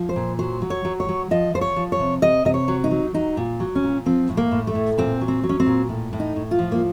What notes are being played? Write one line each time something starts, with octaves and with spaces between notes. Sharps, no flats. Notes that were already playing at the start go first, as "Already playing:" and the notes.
Already playing: F3
C5
A#2
F#3 C5
F#3
C#5
F#3
C#5
F#3
F3 D#5
F3 C5
C#5
F3
C#5
C3
C3 D#5
C3 D#5
C#5
F#3
D#4
F#3
F#3 D#4
A#2
F#3
C#4
A#2
F3 C4
A2
A#3
A2
A3
A2
A#2 C4
F#3
C4
F#3
C#4
C4
A#2
A2
A2
D#4
A2
F4
F3
A#3